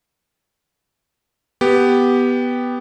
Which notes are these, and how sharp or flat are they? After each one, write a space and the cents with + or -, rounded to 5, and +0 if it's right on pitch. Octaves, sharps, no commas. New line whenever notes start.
B3 +0 G4 +0